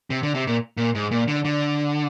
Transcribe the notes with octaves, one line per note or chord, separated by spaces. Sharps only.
C3
D3
C3
A#2
A#2
G#2
A#2
D3
D3